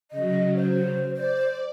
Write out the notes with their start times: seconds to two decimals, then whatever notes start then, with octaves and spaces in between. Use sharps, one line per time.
0.11 C#3 F#3 D#5
0.55 C5
1.15 C5 D5